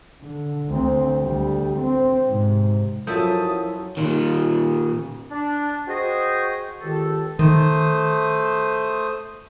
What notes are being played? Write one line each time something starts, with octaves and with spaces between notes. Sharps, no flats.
D3
D2 C4
D2 G3
C4
G#2 C3
F#2 F3 F#3 E4 A4 A5 D#6 G6
A#2 D#3
D4
F#4 G#4 C5 D#5 G5 C#6
C#2 D#3 G4 A4
D#3 A3 C5 D#6